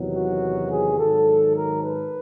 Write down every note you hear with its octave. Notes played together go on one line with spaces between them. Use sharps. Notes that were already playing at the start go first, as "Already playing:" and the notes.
Already playing: E2 C3 D#3 F#3
F#4
G#4
G#2 D#3 F#3 A4
A#4
B4